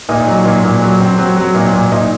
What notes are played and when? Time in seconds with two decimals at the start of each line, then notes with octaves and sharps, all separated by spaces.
0.09 A#2 D#4
0.27 F#3
0.45 A#2
0.64 A#2
0.82 F#3
1.00 C4
1.18 F#3
1.36 F#3
1.55 A#2 D#4
1.73 A#2
1.92 A#2 D#4